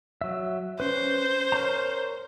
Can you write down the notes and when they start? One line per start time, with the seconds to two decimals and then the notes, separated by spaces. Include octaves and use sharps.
0.21 F#3 E5
0.80 C#4 B4 C5
1.52 A#4 C#5 A#5